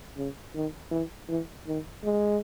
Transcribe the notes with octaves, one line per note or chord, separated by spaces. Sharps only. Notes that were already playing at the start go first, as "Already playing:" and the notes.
C#3
D#3
E3
E3
D#3
G#3